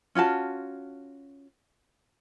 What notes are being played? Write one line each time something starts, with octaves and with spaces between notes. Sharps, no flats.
C#4 F4 F#4 A5